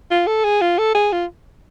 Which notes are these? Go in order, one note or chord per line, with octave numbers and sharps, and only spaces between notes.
F4
A4
G#4
F4
A4
G#4
F4